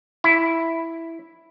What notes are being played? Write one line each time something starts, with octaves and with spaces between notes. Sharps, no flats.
E4